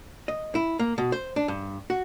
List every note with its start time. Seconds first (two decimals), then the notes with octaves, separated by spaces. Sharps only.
0.28 D#5
0.55 E4
0.79 A#3
0.98 B2
1.12 C5
1.36 D4
1.48 G2
1.90 F#4